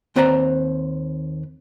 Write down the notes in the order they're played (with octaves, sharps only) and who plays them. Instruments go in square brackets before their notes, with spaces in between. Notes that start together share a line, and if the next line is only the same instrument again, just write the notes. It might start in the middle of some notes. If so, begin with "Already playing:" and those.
[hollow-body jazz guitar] D#2 C4 B4 C5 D5 A#5